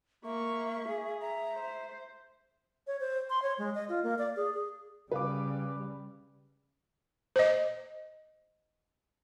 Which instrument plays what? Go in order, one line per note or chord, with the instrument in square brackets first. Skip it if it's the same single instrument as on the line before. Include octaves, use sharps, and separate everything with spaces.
[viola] A#3 C#6 [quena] E5
[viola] G#4
[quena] E5 [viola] A#5
[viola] C5
[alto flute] C#5
C5
C6
C#5
G#3
D#5
F4
A#3
D5
G#4
G#4
[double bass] C#3 G3 [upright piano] B4 F5 D6
[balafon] C5 D#5